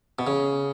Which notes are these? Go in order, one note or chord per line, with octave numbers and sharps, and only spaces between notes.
B2
C#3